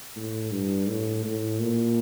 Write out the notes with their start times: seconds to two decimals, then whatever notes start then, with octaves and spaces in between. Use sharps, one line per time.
0.16 A2
0.52 G2
0.89 A2
1.25 A2
1.60 A#2